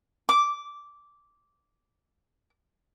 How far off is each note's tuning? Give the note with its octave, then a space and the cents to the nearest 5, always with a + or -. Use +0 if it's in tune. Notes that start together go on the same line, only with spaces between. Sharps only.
D6 -10